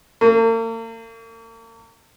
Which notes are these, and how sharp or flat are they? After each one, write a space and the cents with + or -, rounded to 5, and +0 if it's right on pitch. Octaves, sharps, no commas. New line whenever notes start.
A#3 -40